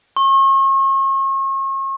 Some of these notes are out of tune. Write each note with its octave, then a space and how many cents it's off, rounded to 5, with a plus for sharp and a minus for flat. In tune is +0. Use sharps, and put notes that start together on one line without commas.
C#6 -40